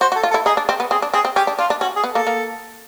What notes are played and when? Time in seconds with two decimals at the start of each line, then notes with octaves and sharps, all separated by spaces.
0.01 F#4 C5
0.12 F#4
0.16 A4
0.23 F4
0.31 A4
0.34 E4
0.46 D#4 G#4
0.57 D4
0.69 C4
0.80 B3
0.91 C4 G#4
1.02 D4
1.14 C4 G#4
1.25 C4
1.36 C#4 G4
1.47 D4
1.59 D4 F4
1.70 D4
1.81 C#4 F#4
1.96 G#4
2.04 B3
2.12 A#3 A4
2.27 A#3